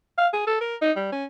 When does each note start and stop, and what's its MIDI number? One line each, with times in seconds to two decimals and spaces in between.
0.18 0.27 77
0.34 0.43 68
0.47 0.57 69
0.61 0.76 70
0.82 0.91 63
0.96 1.11 55
1.12 1.25 61